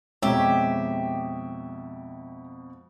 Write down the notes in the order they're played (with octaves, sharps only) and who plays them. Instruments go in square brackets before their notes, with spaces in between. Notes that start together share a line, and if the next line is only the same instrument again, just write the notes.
[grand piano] F2 B2 A#5 [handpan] G#3 C#5 [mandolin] G4 E5